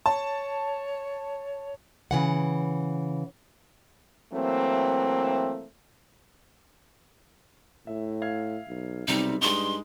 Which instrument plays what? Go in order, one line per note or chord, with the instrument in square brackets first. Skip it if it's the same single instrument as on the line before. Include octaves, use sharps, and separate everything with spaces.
[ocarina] C#5 [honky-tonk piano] A5
[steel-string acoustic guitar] C#3 E3 F#5
[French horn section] E3 F#3 A3 A#3 C4
[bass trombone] A2 [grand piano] E5
[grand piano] E5 F5 G#6
[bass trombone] B1
[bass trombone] B1 [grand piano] C3 G3 C4 [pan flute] D#4
[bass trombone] G2 [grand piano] G#3 D#4 [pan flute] C6